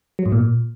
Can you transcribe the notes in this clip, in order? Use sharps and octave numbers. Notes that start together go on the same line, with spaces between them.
F#3
G#2
A#2